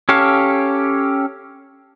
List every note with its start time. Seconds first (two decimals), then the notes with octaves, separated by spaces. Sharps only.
0.09 C#4 G4 A4 C#5 F5